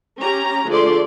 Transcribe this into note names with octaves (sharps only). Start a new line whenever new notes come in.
C#4 G4 A#5
D3 F3 A3 G#4 D5 C6